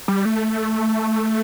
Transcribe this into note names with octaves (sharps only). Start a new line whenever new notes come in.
G3
A3